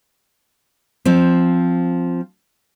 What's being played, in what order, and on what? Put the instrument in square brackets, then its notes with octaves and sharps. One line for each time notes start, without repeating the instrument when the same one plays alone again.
[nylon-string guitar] F3 C4